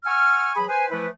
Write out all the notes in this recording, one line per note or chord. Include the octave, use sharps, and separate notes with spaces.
F#5 G#5 C#6 E6 F6
E3 F#3 G#4 G#5 B5
B4 C5 G#5
E3 F3 A3 E4 B4